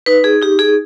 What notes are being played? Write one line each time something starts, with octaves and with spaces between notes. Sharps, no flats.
D#4 B4
G#4
D#4 G4
G#4